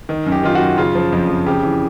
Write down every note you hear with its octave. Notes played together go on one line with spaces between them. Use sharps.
D#3
F#2
G4
D#3 F4
F#4
F#2
C#3 F4
F3
F2
F2
C#3 G4
E3